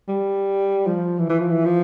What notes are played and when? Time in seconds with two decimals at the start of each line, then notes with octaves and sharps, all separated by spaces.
0.08 G3
0.87 F3
1.19 E3
1.30 E3
1.40 F3
1.50 E3
1.65 F3